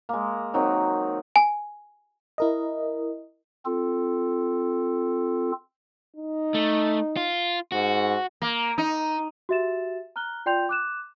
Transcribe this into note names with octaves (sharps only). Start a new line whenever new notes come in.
G#3 A#3
D#3 F#3 C4 D#4
G#5
E4 A#4 D#5
C4 F4 A4
D#4
A3
F4
G#2 F#4
A#3
D#4
F#4 G4 E5 A6 E7
A#5 F6 F#6 G7
F4 D5 G5 C6 G6 F7
D6 F#6 E7